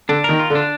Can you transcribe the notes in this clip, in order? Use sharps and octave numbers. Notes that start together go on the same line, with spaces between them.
D3 D4
D#3 A#4
F4
D3
D4